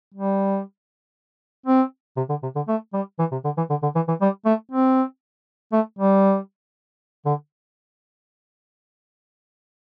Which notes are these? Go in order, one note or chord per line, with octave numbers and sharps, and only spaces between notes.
G3
C4
C3
D3
C3
D3
A3
G3
E3
C3
D3
E3
D3
D3
E3
E3
G3
A3
C4
A3
G3
D3